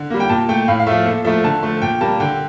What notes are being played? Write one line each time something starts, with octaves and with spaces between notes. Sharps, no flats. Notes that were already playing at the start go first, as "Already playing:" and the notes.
Already playing: D3
G3 A#3
G5
A#2 A5
A3 G5
A2 F5
F5
F3 A3 E5
A#2 A4
F3 A3 E5
D3 A5
F3 A3
A#2 G5
G3 A#3 A5
D3 G5